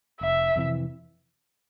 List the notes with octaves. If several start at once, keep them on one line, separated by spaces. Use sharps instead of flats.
F1 E5
F2 C3 E3